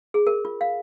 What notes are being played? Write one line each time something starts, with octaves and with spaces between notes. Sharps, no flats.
G#4
A#4
F4
F5